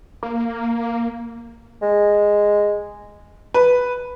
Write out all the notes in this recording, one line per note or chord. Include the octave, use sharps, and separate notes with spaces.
A#3
G#3
B4